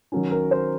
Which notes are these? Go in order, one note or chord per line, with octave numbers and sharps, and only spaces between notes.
D#3 F#3 C#4
A#4
C5